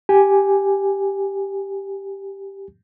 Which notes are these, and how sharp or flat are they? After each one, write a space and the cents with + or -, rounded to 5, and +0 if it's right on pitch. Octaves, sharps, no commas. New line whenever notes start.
G4 +0 G#5 +0